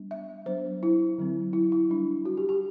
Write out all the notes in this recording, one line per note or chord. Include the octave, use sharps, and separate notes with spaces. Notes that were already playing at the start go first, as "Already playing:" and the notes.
Already playing: G3 B3 D4
E5
F#3 B3 D4 C5
E4
D3 F#3 C4
E4
E4
G3 D4
F#4
G4
G4